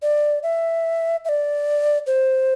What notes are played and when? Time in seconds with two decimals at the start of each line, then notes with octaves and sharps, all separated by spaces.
0.02 D5
0.43 E5
1.25 E5
1.29 D5
2.07 C5